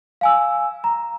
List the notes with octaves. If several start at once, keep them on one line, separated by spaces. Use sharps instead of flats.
F5 G#5 E6
A#5